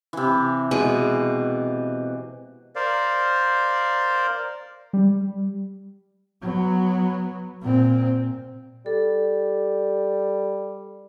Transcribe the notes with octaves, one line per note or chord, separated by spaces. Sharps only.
C3 E3
B2 G#3
A#4 C5 D5 F5
G3
F#3 B3
A#2 C4
G3 A4